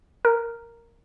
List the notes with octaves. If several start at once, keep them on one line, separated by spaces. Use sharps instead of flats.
A#4